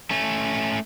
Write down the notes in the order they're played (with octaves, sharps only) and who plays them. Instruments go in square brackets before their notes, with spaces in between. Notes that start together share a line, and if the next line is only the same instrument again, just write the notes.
[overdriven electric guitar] A3 C#4